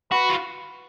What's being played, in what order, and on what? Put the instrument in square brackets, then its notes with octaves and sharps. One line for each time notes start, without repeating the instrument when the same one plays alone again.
[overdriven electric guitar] F#4 [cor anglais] B4
[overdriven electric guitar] F4